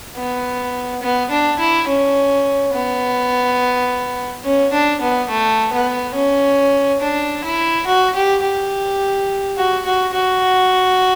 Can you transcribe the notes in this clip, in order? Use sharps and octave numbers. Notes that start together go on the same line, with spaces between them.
B3
B3
D4
E4
C#4
B3
C#4
D4
B3
A3
B3
C#4
D4
E4
F#4
G4
G4
F#4
F#4
F#4